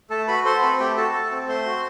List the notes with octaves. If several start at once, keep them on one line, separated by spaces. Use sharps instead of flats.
A3 A4 A5
F#4 B4 B5
A4 C5 C6
C4 B4 B5
A3 G4 G5
F#4 A4 A5
A4
C4
A3 C5 C6
F#4